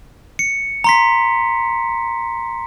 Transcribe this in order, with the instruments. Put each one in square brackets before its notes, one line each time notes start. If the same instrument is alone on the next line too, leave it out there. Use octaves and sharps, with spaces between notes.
[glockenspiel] C#7
A#5 C6 B6